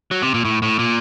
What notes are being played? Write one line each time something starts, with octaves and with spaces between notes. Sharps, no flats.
F#3
C3
A#2
A2
A2
A#2